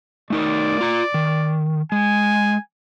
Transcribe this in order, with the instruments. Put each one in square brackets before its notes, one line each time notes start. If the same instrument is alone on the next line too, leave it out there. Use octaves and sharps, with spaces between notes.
[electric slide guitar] A3 D#4 A#4 [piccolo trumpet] D5
[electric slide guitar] F4 A#5
D#3
[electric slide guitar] G#3 [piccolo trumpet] G#5